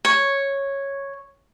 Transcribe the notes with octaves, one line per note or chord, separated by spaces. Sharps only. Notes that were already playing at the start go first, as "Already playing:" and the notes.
C#5